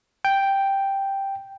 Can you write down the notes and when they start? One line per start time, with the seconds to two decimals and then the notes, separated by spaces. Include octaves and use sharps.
0.25 G5